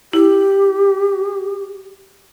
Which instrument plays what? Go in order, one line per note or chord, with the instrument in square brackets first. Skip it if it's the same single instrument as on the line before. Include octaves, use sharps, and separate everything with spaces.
[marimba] E4 [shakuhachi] G4